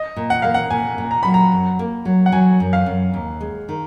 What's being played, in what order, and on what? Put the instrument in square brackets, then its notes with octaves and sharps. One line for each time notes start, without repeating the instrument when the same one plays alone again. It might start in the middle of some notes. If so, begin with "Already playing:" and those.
Already playing: [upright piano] D#5
[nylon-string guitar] A#2
[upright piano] F#5
[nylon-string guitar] A#3 [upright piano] F5
[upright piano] F#5
[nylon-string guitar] A#2 [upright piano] G#5
[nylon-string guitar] A#2
[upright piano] A#5
[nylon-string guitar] F#3 [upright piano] B5
[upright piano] A#5
[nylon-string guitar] F#2
A#3
F#3
[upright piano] F#5
[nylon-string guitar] F#3 [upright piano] G#5
[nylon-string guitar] F#2
[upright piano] F5
[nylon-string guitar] F#2
D#2
G#3
D#3